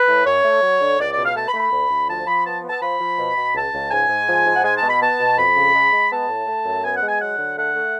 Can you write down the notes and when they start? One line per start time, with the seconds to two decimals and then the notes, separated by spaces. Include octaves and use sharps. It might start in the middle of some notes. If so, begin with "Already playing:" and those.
Already playing: B4
0.08 A2
0.26 F#2 C#5
0.44 A3
0.63 F#3
0.81 D3
0.99 C#2 D5
1.11 D5
1.17 B2
1.24 F5
1.35 A3 A5
1.48 B5
1.54 A3
1.60 B5
1.72 D2
1.90 D2
2.09 F3 A5
2.27 F3 B5
2.45 B3 A5
2.64 B3
2.70 A5
2.82 F3 B5
3.00 F3
3.18 B2
3.37 B2
3.55 C#2 A5
3.73 C#2
3.91 G#2 G#5
4.09 G#2
4.28 F3
4.46 G#2
4.55 F#5
4.64 G#3 G#5
4.77 A5
4.83 B2
4.89 B5
5.01 B3 A5
5.20 B2
5.38 F2 B5
5.56 C#3
5.74 G#3
5.93 G#3
6.11 B3 A5
6.29 A2
6.47 A3
6.65 F#2
6.84 B3 G#5
6.96 F#5
7.02 G#3
7.08 G#5
7.20 F#3 F#5
7.39 D3
7.57 A3 F#5
7.75 A3